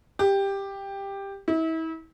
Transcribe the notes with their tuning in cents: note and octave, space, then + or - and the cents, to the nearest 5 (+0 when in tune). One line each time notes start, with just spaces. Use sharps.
G4 +10
E4 -35